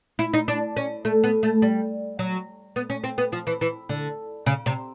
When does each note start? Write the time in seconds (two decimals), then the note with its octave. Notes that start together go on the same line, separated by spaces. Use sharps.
0.19 E4
0.33 D#4
0.48 D4
0.77 C#4
1.05 A3
1.24 B3
1.43 A3
1.62 G3
2.19 F#3
2.76 B3
2.90 C#4
3.04 C4
3.18 B3
3.32 F3
3.47 E3
3.61 E3
3.89 D3
4.46 C#3
4.66 C3